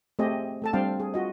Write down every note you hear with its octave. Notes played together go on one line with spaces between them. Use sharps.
A3 C4 G4 G#4 D#5
A3 A4 A5
G3 C4 D4 F5 G5
G#4
F4 F#4 D#5